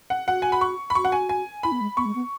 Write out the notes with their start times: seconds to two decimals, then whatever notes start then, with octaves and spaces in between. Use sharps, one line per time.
0.10 F#5
0.27 F#4 F#5
0.42 G#5
0.52 B5
0.61 C#6
0.90 B5
0.95 F#4 C#6
1.05 F#5
1.12 G#5
1.29 G#5
1.63 E4 B5
1.72 B3
1.81 G#3
1.97 B3 C#6
2.06 G#3
2.15 B3